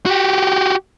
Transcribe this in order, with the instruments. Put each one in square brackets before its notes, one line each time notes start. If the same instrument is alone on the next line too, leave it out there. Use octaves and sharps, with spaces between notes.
[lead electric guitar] F#4 G4